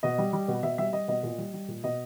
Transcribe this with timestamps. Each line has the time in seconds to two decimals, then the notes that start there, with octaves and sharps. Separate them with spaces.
0.03 B2 D#5
0.18 G3
0.33 G3
0.48 B2
0.63 B2 E5
0.78 G3 E5
0.93 G3 D#5
1.08 B2 D#5
1.23 A#2
1.38 G3
1.54 G3
1.68 A#2
1.84 B2 D#5